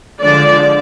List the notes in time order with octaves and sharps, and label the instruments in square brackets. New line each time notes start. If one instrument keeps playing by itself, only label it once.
[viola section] D3 F3 G#3 D4 D5